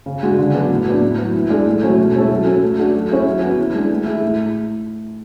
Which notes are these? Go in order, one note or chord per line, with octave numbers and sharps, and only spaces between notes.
C#3
G#3 D4 F#4
D3
F#3 B3 D4 G#4
A2
F#3 B3 D4
A2
F#3 B3
E3
G#3 D4 A4 D5
A2
F#3 A3 C#4 F#4
B2
G#3 C#4 E4 A4
F#3
C#4 F#4
A3
D4 F#4 A4
F#3
C#4 E4 G#4
F#3
B3 F#4
E3
G#3 D4
A3
E4 G#4
A2